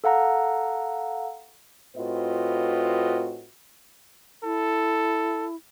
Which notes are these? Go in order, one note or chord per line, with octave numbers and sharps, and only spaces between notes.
A4 F5 F#5 A#5
A2 C4 F4 F#4 B4 D#5
E4 A4